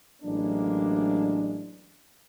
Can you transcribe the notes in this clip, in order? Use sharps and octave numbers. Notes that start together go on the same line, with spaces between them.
A1 F#3 G#3 A#3 D4